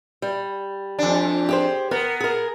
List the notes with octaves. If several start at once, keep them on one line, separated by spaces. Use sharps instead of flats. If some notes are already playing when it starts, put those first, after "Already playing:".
G3
F2 D4
G4 G#4 C5
B3 A#4
G#4 A#4